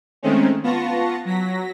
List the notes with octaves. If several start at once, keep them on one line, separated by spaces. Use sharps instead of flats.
D#3 G#3 A3 C4 C#4
B3 F4 A5 C#6 A#6
F#3 A#6 B6